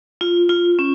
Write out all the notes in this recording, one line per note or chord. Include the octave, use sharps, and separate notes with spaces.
F4
F4
C#4